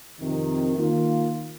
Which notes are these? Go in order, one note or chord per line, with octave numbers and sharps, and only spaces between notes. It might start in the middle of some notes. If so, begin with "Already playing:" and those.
F2 C3 D#3
D#3 A#3 F4